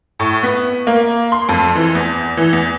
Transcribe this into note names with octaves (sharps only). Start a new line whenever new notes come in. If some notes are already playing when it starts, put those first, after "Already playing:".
A2
B3
A#3
C6
F2
E3
E2
E3
E2